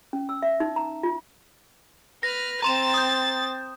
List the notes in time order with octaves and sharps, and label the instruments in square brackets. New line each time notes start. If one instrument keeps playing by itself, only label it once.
[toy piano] C#4
E6
E5
D#4
A#5
F4
[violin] B4 F6 [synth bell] A#6
[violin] C4 A6 [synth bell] A#5 C6 E7
[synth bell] D#6 G6